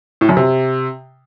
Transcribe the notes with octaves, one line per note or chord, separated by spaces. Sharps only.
A2
F#2
C3